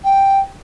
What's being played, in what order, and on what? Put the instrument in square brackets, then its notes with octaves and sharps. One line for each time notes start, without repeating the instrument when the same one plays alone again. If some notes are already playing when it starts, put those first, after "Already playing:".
[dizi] G5